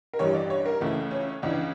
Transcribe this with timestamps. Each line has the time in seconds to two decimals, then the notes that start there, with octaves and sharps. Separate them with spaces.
0.14 A#4
0.19 A1 G2 E3 G3 C#5
0.34 D5
0.50 C#5
0.66 A#4
0.80 C#2 C#3 E3 A3
1.11 C#4
1.42 C#2 C#3 E3 D4